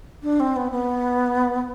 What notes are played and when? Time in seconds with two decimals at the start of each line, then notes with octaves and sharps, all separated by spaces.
0.23 D4
0.39 C4
0.56 B3
0.71 B3